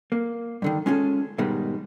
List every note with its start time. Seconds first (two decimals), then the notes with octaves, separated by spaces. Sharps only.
0.12 A#3
0.62 G2 D3 D#3
0.86 G#3 C#4 F4 F#4 G#4 A4
1.38 G#2 B2 D#3 G3 G#3